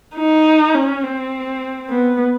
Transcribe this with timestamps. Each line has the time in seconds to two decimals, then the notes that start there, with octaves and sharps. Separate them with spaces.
0.16 D#4
0.75 C#4
1.04 C4
1.90 B3